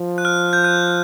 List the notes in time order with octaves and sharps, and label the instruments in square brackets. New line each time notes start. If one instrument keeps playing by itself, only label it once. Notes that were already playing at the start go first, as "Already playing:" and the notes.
Already playing: [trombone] F3
[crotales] F#6
F6
G6
F#6